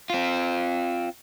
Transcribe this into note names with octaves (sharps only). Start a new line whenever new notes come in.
C4 F4